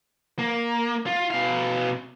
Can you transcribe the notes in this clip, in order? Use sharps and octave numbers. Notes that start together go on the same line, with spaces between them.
A#3
F4
B2 F5